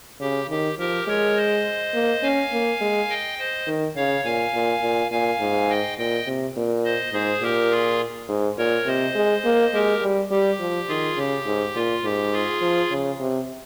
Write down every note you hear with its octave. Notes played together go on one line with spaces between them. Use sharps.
C#3 G4
D#3 G4
F3 G4 A#4
G#3 A#4 C#5
C5 D#5
A#3
C#4 F5 G#5
A#3
G#3
D#5 G5
C5 D#5
D#3
C#3 C#5 F5
A#2 F5 G#5
A#2
A#2
A#2 F5 G#5
G#2
D#5 G5
A#2 D#5 G5
C3
A#2
C5 D#5
G#2 G#4 C5
A#2 G4 A#4
F4 G#4
G#2
A#2 A#4 C#5
C3 C5 D#5
G#3
A#3
G#3 G4 A#4
G3
G3 G4
F3
D#3 F4 G#4
C#3 G4
G#2
A#2 F4
G#2 G4
F4 G#4
F3
C#3
C3